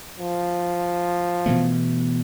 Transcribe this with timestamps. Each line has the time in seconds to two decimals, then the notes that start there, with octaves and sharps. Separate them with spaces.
0.18 F3
1.46 B2 E3 A3